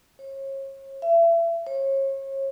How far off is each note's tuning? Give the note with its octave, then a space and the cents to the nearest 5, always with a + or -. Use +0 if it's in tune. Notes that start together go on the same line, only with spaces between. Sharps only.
C#5 -35
E5 +35
C#5 -35